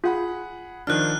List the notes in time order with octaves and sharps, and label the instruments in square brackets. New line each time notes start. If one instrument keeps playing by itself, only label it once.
[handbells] F4 [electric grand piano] G#4 F#5 B5
[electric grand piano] D#3 F3 D4 [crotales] F6 F#6